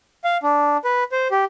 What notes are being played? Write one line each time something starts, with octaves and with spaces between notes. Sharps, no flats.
F5
D4
B4
C5
G4